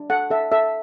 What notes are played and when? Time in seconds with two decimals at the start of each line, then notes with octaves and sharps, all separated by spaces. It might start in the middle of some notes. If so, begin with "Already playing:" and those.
Already playing: D4
0.10 A4 F#5
0.30 A4 E5
0.52 A4 E5